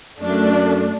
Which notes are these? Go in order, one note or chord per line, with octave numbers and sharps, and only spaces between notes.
F#2 A3 D4